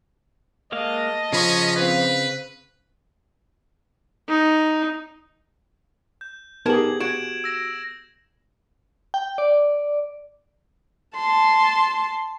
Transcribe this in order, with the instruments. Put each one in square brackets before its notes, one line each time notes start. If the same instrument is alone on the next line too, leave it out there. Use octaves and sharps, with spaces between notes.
[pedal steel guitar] G#3 A#3 F5 [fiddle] D#5 A5
[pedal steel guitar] C#3 B5 C#6 [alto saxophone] F3 [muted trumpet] C#4
[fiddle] C4 F5 [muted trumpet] B4
[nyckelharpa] D#4
[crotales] G6
[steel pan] B3 G4 G#4 [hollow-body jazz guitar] D#4 A#4 A5 [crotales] G#6 F#7
[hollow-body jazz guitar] F#4 [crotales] G#6 D7 E7
[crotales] E6 A#6 E7
[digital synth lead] G5
D5
[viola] A5 C6